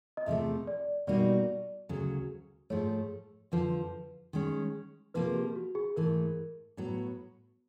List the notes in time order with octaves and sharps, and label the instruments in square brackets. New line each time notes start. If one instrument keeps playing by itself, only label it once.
[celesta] D#5
[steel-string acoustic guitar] E2 C3 F3 A3 [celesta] E5
[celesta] D5
[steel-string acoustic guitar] B2 G3 A#3 D#4 F#4 [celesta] D5
[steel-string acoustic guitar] D2 C#3 F#3
[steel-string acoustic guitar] G#2 F3 A3 [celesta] C#5
[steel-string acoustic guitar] F2 D3 F3 [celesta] B4
[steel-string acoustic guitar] D#3 G#3 C#4
[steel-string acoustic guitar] C3 F3 A#3 [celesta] B4
[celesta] G#4
G4
F#4
G#4
[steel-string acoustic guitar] G#2 E3 A3 [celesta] A#4
[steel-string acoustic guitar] A2 F#3 B3